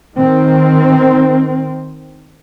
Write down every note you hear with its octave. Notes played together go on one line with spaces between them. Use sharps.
D#3 C4